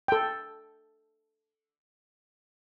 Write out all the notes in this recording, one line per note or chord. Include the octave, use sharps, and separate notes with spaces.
A4 G5